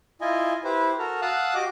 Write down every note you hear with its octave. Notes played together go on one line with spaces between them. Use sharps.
E4 F4 D#5 G#5
E4 G4 B4 C5
F#4 A4 A#4 A#5
F5 F#5 A5 D#6 E6 F#6
F#4 G4 D#5 D6